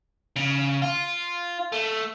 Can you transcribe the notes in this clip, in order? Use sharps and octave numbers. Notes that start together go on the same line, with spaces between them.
C#3
F4
A3